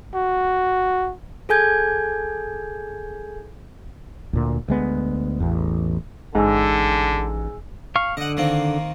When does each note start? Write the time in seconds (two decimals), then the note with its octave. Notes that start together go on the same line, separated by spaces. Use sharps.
0.14 F#4
1.49 G#4 A4 G#5 G6 G#6
4.33 D2 A#2
4.68 D2 G#3 B3
5.40 A1 E2
6.35 A1 G#2 D3 G#4 G#5 E6
7.96 F5 C#6
8.17 D3 D#5 F#5
8.37 D#3 A#3 C4